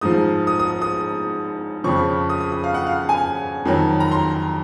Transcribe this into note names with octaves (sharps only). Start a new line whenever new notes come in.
G#2 F3 D#6
D#6
D#6
D#6
F2 C#3 F3 C#6
D#6
D#6
D#6
F5
F#5
F5
G#5
F2 D#3 F#3
A#5
C6